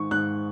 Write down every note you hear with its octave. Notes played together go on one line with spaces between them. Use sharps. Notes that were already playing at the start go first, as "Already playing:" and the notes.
Already playing: G#2 D#3 C#6
G#2 F#6